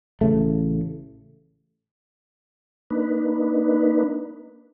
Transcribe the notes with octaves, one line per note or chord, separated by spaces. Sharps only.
A1 C#3 A3
A#3 D4 D#4 B4